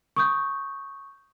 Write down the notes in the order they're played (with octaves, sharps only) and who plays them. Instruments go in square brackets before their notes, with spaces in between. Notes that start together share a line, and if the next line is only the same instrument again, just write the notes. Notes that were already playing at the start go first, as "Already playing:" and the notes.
[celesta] C#6 D#6 G6